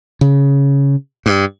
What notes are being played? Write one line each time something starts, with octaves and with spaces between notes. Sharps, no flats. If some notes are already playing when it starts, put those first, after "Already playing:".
C#3
G2